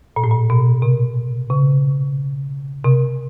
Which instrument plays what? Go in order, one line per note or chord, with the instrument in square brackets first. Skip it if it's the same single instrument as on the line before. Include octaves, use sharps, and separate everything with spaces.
[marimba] A#2
A2
A#2
B2
C3
C#3
C3